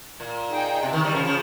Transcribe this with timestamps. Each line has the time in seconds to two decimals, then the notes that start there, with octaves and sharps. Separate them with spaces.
0.20 A#2
0.52 D#4 G#4 D#5 G5
0.83 C3
0.93 C3 D#3
1.04 D#3 G3
1.14 C#3 F3
1.25 C#3 F3